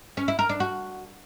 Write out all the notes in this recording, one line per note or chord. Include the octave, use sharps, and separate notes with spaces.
C#4
E4
A#4
D4
F#4